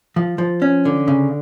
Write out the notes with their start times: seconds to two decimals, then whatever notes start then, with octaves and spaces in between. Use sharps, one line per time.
0.16 F3
0.38 F3
0.62 C#4
0.85 D3
1.08 C#3